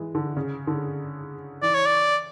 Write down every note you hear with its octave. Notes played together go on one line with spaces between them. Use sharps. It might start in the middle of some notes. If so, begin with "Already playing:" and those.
Already playing: E3 G#3
D3
C#3
D3
E3 D5
C#5
D5